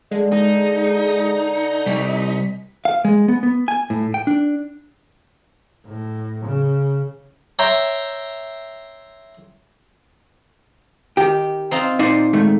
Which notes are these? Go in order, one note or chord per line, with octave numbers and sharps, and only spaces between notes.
D3 G#3
D#4
C3 G3 B6
F5
G#3
B3
B3
G#5
A2
G5
D4
A2
C#3
C#5 E5 G5 A#5 C6
D#3 G4
C4 D#4 F4
A#2 D#4 C5 D5
G#2 D#3 A3